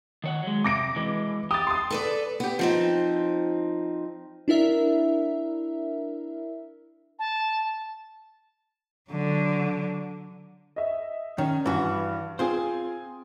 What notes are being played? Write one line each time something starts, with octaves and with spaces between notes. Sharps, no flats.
D#3 C#5 F#5
F#3 G#3
C3 D6 A#6 D7
E3 G#3
G4 D#6 A6
C6 D#6
A4 B4 D5
B3 G4
F3 C4 D#4
D4 E4 A#4 E5
A5
D3 F#3
D#5 E5
D#3 C#4
G2 E3 F#4
C4 F4 G#4 C5 G#5